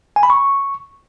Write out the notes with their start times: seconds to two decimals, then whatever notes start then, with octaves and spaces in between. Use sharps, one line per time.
0.16 G#5
0.23 B5
0.30 C#6